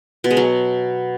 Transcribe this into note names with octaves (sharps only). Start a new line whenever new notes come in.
B2
G#3
F#3